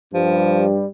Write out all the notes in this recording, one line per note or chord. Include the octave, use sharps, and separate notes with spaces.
G2 F3 G3